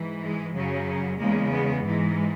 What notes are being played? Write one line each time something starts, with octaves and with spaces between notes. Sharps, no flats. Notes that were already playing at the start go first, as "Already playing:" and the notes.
Already playing: G#2 E3
G#3
F#2 C#3 F#3
E2 C#3 G#3 A#3
B3
G#2 E3 G#3